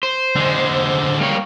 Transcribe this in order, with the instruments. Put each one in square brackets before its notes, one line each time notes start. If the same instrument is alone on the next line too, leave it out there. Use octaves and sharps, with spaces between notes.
[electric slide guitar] C5
[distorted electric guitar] D3 G#3
[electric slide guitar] G3 A#3 C#5